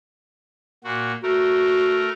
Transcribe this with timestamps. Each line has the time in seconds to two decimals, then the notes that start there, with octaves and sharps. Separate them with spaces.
0.84 A#2 F#4
1.23 A3 F#4 A#4